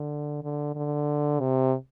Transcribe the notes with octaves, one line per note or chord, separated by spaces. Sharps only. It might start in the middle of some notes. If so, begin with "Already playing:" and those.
Already playing: D3
D3
D3
C3